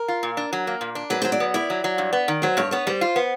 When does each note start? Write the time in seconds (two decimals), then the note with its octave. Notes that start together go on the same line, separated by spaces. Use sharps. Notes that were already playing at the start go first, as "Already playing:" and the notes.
Already playing: A#4
0.08 F4
0.23 A#2
0.37 D4
0.53 F#3
0.67 A#3
0.81 A#2
0.95 D4
1.10 F#3 B4
1.22 F#3 C5
1.32 D5
1.40 B3
1.54 E4 D5
1.70 F#3
1.84 F#3
1.98 G2
2.13 B3
2.28 D#3
2.42 F#3 C5
2.57 G2 C#5
2.71 B3 C#5
2.87 G3 C5
3.01 F4
3.16 B3